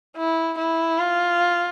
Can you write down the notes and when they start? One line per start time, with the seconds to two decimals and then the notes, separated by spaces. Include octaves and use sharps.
0.17 E4
0.58 E4
0.99 F4